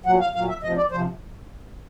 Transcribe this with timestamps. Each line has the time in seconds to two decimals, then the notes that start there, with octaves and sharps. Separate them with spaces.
0.06 A#2 F#3 F#5
0.20 F5
0.35 A#2 F#3 F5
0.49 E5
0.63 D2 C3 F3 D#5
0.77 D5
0.91 C3 F3 C5